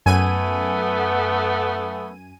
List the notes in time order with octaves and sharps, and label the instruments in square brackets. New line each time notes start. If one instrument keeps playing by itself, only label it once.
[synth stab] F#2 G#5 D#7 [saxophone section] A3 B3